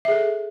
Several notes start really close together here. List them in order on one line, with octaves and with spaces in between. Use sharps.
E5 G#4 A4